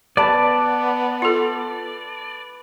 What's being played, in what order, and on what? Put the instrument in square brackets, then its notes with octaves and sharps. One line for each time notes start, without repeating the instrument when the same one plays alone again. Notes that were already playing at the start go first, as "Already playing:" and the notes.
[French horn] B3 [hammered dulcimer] B4 A5 [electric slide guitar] D5
[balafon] F4 A4